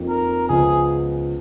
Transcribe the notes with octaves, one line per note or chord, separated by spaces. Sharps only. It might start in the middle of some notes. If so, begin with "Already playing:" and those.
Already playing: F2 F3 A#3 D#4
A#4
C#2 C#3 F3 B3 G#4